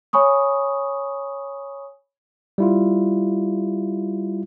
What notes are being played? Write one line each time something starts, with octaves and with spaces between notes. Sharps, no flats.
C#5 G#5 B5 C#6 D#6
G3 E4 F4